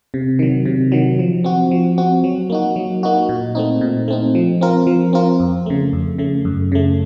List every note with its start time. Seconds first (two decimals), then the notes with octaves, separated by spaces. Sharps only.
0.14 C3
0.39 D#3 F#3
0.65 C3
0.92 D#3 F#3
1.19 F3
1.44 C4 F#4
1.71 F3
1.98 C4 F#4
2.24 F#3
2.50 A#3 D#4 F#4
2.76 F#3
3.03 A#3 D#4 F#4
3.29 A#2
3.55 A3 C4 D#4
3.81 A#2
4.08 A3 C4 D#4
4.35 F3
4.61 C4 F4 A#4
4.87 F3
5.13 C4 F4 A#4
5.40 F2
5.66 C#3 A3
5.93 F2
6.18 C#3 A3
6.45 F#2
6.72 C#3 A3